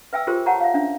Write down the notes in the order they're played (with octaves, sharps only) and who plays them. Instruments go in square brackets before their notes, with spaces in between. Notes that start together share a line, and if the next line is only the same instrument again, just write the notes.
[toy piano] B4 E5 G5 G#5 E6
F4 G4 G#4 A#4 C5
G4 C#5 F#5 A5 A#5 C#6
E5 F5
C#4 D4 E5